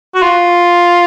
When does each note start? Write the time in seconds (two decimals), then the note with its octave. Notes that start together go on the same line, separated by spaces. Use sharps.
0.15 F#4
0.23 F4